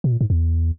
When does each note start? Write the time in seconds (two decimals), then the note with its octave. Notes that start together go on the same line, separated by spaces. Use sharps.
0.04 B2
0.12 A#2
0.21 G#2
0.30 E2